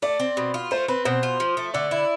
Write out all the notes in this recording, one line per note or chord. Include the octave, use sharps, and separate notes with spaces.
A3 D5
C4
B2
F4
A3 C5
C4 B4
B2 C5
F4
F3
A3
D3 D5
E4